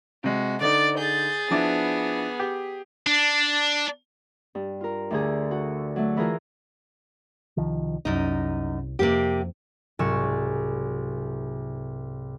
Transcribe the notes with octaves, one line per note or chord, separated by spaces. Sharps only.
C3 G#3 F#4
D3 D#4 D5 A6 D7
G#4 G6 A6
F3 B3 D4 E4
G4
D4
G2
F4 A#4
D2 D3 G#4
F#4
F#3 A3
E3 E4 F4 G#4 A#4
C2 D#3 F3
C2 F#2 D#4
F2 C3 A#3 G4
C2 G#2 F#3 G#5 C#6 E6